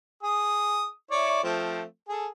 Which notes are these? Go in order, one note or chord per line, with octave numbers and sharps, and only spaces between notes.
G#4 D#6
E4 C#5 D5
F3 A3 C4
G#4 A4